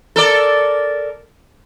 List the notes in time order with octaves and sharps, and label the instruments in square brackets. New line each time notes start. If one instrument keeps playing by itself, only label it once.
[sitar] A4 A#4 D5